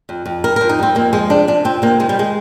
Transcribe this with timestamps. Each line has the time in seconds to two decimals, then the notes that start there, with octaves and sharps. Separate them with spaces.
0.09 F2
0.26 F2
0.44 G3 A#4
0.56 F2 A#4
0.69 D#4
0.79 G3 C4
0.95 F2 A#3
1.13 F3 G#3
1.30 C3 D4
1.47 C3 D4
1.65 F2 C4
1.82 C3 A#3
2.00 D#3 G#3
2.09 G3
2.19 G#3